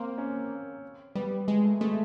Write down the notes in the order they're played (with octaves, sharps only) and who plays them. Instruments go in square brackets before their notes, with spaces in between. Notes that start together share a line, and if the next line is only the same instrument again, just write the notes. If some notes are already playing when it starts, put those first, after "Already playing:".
Already playing: [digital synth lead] A#3 [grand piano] C4
[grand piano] C#4
[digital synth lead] G3 [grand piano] B3
[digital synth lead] G#3
[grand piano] A3
[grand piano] G#3 [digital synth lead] A3